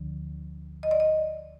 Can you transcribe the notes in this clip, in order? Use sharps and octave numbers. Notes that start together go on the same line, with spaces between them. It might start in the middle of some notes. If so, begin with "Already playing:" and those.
Already playing: D2 D3 F3
D#5
D5
D#5